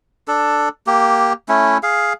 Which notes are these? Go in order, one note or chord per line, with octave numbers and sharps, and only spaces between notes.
D4 A4
A#3 G4
A3 C#4 E4
G#4 F5